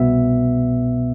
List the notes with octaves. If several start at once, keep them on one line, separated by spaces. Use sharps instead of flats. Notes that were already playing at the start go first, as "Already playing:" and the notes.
Already playing: C2 B2 B3 E5